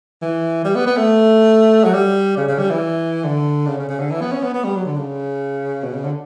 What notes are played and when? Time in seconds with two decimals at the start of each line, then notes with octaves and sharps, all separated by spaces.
0.22 E3
0.65 G3
0.75 B3
0.87 B3
0.97 A3
1.84 F#3
1.94 G3
2.37 C#3
2.48 C#3
2.59 G3
2.70 E3
3.24 D3
3.67 C#3
3.78 C#3
3.89 C#3
3.99 D3
4.11 E3
4.21 B3
4.32 C#4
4.43 B3
4.54 B3
4.64 G3
4.76 F#3
4.86 D3
4.97 C#3
5.83 B2
5.94 C#3
6.04 D3